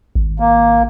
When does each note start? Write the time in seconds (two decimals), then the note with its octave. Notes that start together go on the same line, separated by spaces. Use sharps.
0.15 G#1
0.40 A#3